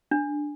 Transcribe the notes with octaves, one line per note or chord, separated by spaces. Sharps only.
D4